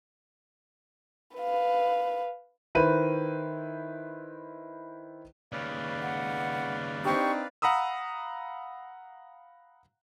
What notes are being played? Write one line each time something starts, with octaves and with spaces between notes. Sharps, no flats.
B4 F5
D#3 E4 B4 C5 D#7
D#2 C#3 B4 D5 F5
F#5
C4 D4 D#4 G4 C5 C#6
F5 F#5 A#5 B5 D#6 E6